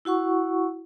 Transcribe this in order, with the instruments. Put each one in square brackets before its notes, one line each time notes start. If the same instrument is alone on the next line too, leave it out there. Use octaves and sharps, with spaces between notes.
[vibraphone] E4 F#4 F#5 C#6